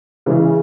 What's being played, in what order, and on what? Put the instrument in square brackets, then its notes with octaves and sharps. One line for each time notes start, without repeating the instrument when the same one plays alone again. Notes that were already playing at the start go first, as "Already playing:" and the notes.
[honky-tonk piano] C#3 E3 G#3